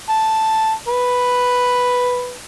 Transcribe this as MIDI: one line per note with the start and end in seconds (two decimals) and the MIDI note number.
0.10 0.71 81
0.88 2.34 71